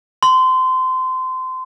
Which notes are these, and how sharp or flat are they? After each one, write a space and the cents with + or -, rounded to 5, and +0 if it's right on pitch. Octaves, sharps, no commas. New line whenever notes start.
C6 -25